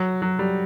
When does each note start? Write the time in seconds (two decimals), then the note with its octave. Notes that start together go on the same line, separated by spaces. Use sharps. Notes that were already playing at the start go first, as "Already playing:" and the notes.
Already playing: F#3
0.22 F#3
0.39 G3